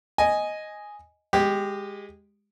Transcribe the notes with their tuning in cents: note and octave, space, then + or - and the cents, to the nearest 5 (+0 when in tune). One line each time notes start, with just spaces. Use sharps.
D#5 +0 G#5 +0
G#3 -15 G4 +0